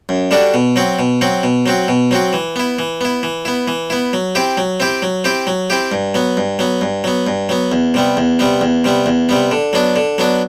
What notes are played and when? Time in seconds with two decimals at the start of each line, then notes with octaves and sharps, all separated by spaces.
0.09 F#2
0.31 D3 G3 D4 F#4
0.54 B2
0.76 F#3 C4 F#4
0.99 B2
1.21 F#3 C4 F#4
1.43 B2
1.66 F#3 C4 F#4
1.88 B2
2.11 F#3 C4 F#4
2.33 E3
2.56 B3 E4
2.79 E3
3.01 B3 E4
3.23 E3
3.45 B3 E4
3.68 E3
3.90 B3 E4
4.13 F#3
4.35 C4 E4 G4
4.57 F#3
4.80 C4 E4 G4
5.02 F#3
5.24 C4 E4 G4
5.47 F#3
5.70 C4 E4 G4
5.92 G2
6.14 F#3 B3
6.37 G2
6.59 F#3 B3
6.81 G2
7.04 F#3 B3
7.27 G2
7.49 F#3 B3
7.72 E2
7.94 C3 G3 B3
8.17 E2
8.39 C3 G3 B3
8.61 E2
8.84 C3 G3 B3
9.06 E2
9.29 C3 G3 B3
9.51 D3
9.73 F#3 B3 D4
9.96 D3
10.18 F#3 B3 D4